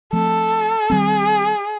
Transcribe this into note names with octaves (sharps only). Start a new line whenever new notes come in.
F3 A3 C4 A4
D#3 G3 C4 G#4